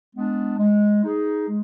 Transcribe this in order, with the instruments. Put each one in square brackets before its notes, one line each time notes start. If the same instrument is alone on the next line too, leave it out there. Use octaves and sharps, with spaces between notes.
[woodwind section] G#3 B3 D4
G#3
D#4 G#4
G#3